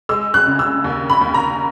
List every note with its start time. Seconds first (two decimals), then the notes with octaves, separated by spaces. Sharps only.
0.09 G#3 E6
0.34 F#6
0.47 C#3
0.59 E6
0.84 D#2
1.10 B5
1.21 D#2
1.34 A#5